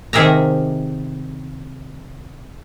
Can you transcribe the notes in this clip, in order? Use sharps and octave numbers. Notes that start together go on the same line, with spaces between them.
C3 D#3 G#4 A#4 E5 A#5